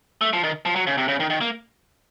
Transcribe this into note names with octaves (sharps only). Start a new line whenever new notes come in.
A3
F3
D#3
F3
F#3
C#3
C3
C#3
D#3
D#3
A#3